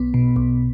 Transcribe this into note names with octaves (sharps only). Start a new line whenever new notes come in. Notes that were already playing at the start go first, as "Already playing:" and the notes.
Already playing: B1 B3
B2
B1